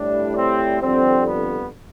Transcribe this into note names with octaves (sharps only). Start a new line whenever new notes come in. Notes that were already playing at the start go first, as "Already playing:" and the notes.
Already playing: A2 G3 D4
C4
F2 D3 G3 C4
B3